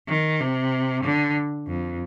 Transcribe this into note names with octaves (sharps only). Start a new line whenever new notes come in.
D#3
C3
D3
F2